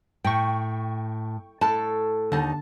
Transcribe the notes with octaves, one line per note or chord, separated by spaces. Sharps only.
A2 G5 C#6
A2 A4 A5
D#2 D3 D#4 A5